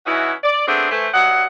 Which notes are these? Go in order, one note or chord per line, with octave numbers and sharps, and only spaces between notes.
E3 C#4 D#4 E4 F#4
D5
A3 B3 C4 D4 G#4 C5
E3 A3 C5
G2 F#3 D#5 F#5